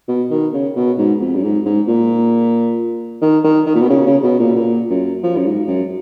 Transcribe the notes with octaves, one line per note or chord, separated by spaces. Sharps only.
B2
D#3
C#3
B2
G#2
F2
F#2
G#2
G#2
A#2
D#3
D#3
D#3
A#2
B2
C#3
C#3
B2
A#2
A#2
F#2
F3
F#2
G#2
F#2